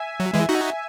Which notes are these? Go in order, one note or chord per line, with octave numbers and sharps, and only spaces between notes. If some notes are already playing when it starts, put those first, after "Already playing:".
Already playing: E5 G#5
F#3
E3 G#3
D#4 F#4